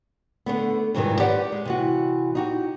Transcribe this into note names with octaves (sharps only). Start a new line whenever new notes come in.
D3 A3 B3
F2 G#2 C3 D#3 E3 G3
G4 B4 D5 F#5
G#3
C3 E3 F#4
D#4 F#4 G4